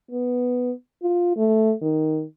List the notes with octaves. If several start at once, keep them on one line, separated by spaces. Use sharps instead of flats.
B3
F4
A3
D#3